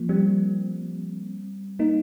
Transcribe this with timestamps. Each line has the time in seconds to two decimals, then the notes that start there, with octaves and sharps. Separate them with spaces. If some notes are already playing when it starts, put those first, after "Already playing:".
Already playing: F3 A#3
0.09 G3 C4
1.79 A#3 D#4